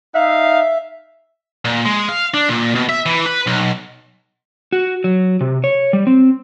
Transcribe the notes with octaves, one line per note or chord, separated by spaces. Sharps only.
D#4 E5 F5
A#2
G#3
F5
D4
A#2
B2
E5
E3
B4
B1
F#4
F#3
C3
C#5
G3
C4